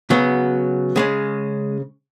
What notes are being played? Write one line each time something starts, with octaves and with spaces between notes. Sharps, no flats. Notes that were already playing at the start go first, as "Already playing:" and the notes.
C#3 F#3 B3
C#3 G#3 C#4